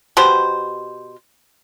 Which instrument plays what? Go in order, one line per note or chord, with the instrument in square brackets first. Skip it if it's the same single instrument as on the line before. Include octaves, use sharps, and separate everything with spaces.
[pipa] B2 G4 C5